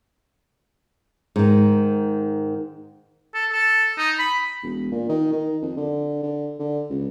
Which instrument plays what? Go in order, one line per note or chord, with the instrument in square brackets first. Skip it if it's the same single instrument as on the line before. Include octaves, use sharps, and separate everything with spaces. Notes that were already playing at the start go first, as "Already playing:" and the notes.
[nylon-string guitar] G#2 D#3
[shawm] A4
A4
D#4
B5
[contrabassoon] E1
A#2
D#3
D#3
F2
D3
D3
D3
C#2